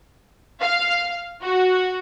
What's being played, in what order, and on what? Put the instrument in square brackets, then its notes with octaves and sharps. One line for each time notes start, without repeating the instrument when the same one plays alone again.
[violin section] F5
F#4